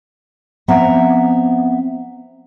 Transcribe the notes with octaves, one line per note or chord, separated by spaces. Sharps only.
F3 B3 C4 E5 F#5 A#5